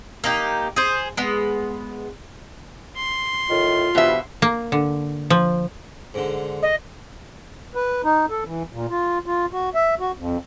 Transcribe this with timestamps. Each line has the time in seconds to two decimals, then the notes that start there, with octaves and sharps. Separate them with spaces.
0.24 A#3 D#4 G4
0.76 G#4 C5
1.17 G#3 B3
2.96 C6
3.50 A2 D#3 F4
3.95 B2 E3 F3 G3 E5
4.42 A#3
4.72 D3
5.30 F3
6.14 G#2 D3
6.62 D#5
7.75 B4
8.04 D#4
8.30 A4
8.45 E3
8.73 A#2
8.90 F4
9.26 F4
9.53 F#4
9.75 E5
10.00 F#4
10.18 F2